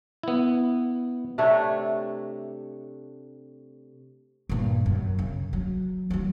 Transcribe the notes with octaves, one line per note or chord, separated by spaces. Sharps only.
B3 E4
C3 A3 D4 C#5
G2 A#2
F#2
C#3
F#3
E3 F#3